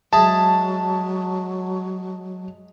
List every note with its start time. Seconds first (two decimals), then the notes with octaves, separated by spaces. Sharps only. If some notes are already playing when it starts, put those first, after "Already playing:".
0.13 F#3 G#3 G#4 E5 A5